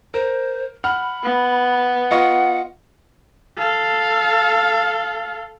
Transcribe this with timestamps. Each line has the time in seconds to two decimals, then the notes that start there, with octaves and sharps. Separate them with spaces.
0.14 A#4 C5
0.84 F#5 B5 F6
1.23 B3
2.11 F4 D#5 F#5 C#6
3.58 A4 F5